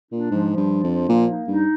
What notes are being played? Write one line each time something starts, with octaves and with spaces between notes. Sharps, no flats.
A#2 D4
G#2 F3
F3
G2
D4
F2
F3
A#2 A#3
D#4
G2 D#4